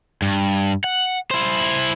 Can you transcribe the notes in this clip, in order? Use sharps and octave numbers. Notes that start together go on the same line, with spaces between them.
G2
F#5
E4 C5